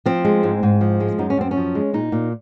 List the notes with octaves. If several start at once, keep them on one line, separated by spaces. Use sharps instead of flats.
F3 C4
G#3
G#2
G#2
F3
G#3
F#2 D#4
C#4
F#2 C4
C#4
F3
G#3
A#2 D#4
A#2